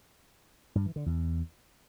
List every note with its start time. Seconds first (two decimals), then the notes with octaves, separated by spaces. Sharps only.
0.75 G2
0.86 E3
0.96 D3
1.06 E2